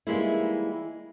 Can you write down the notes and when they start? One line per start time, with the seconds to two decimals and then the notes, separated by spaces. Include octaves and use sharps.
0.07 E3 G3 G#3 A#3 D#4 E4